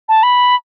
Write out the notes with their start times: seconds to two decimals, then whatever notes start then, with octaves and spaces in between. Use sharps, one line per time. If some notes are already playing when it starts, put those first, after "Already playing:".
0.09 A5
0.23 B5